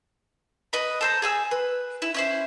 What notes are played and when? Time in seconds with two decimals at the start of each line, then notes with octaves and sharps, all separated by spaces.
0.73 B4 D#5 B5
1.01 A4 C5 A#5
1.22 G#4 G#5 E6
1.51 B4
2.02 E4
2.14 C#4 E4 C5